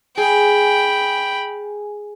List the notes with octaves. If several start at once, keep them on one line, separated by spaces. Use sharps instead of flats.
G#4 G5 B5